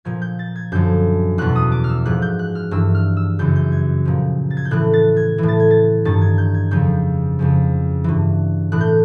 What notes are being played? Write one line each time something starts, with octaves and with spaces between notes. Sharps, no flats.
A#2 F3 G#6
G6
A6
G#6
F#2 D3 F3 G6
E2 B2 F#6
D#6
D6
F6
E6
G#2 F3 F#6
G6
F#6
F6
G2 E3 E6
F6
E6
F#2 C#3 E3 G6
G6
G#6
A#2 F3
A6
G#6
G6
A2 E3 F#6
A6
G#6
A2 E3
A6
G#6
A6
G2 D#3 A6
G#6
G6
G#6
F2 C#3 F3 G6
F2 C#3 F3
G2 E3
A2 E3 F#6
G6